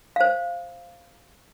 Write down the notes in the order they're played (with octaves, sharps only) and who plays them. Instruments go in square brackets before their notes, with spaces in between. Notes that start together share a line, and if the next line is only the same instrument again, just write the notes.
[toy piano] C5 F5